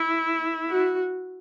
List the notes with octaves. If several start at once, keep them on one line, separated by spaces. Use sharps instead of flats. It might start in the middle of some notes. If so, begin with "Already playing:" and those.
Already playing: E4
F#4